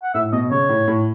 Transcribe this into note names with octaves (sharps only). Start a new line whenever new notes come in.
F#5
A2 E5
B2 D#5
C#3 C#5
A2
A2